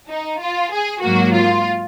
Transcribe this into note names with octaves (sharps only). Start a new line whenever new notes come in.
D#4
F4
G#4
G#2 F#3 A#3 F#4
F4